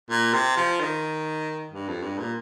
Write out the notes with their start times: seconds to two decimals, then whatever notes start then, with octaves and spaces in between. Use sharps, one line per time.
0.11 A#2
0.34 C3
0.57 F3
0.80 D#3
1.72 G2
1.88 F2
2.02 G2
2.19 A#2